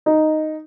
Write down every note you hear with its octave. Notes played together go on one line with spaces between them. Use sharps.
D#4